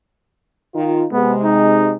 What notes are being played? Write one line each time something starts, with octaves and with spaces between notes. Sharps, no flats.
D#3 D#4 F4
C3 G#3 B3
D#4